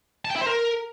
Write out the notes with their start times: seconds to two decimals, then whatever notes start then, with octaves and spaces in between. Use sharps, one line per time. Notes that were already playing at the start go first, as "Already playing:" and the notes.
0.25 A5
0.30 G5
0.36 E4
0.41 C5
0.46 A#4